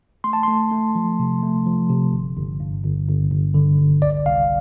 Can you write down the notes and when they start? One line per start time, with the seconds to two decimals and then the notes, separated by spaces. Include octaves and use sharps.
0.24 A3 C6
0.33 A5
0.43 A3 C6
0.72 A3
0.95 F3
1.19 C3
1.43 A3
1.66 F3
1.89 C3
2.13 G1
2.37 G1
2.60 G2
2.84 G1
3.08 G1
3.31 G1
3.54 D3
3.78 G1
4.02 C2 D5
4.26 C2 F5